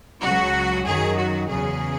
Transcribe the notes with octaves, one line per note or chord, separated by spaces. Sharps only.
C#2 C#3 F#3 F#4
F#2 D#3 F#3 G#4
F#4
E2 C#3 F#3 G#4